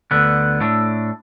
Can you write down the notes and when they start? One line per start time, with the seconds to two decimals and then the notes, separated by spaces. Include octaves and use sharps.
0.11 D2 D3 B3 D4
0.61 A2 A3 D4